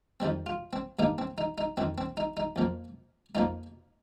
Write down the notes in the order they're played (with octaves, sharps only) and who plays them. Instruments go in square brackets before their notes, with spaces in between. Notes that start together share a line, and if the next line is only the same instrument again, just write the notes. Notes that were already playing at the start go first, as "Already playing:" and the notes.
[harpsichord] F2 D#3 G3 C4
F4
C4
G2 D#3 A#3 D#4
C4
D#4
D#4
F2 D#3 C4
C4
D#4
D#4
F2 F3 A#3
F2 F3 A#3 D#4